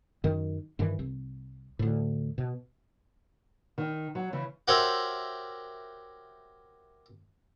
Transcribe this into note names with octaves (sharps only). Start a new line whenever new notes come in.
F#2 D#3
G2 D#3 E3
C2
D2 A2
B2
D#3
F#3
C#3 E3
F#4 G4 A#4 C5 C#5 E5